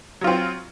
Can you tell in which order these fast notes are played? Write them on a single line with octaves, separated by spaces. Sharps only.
F#3 F4 C4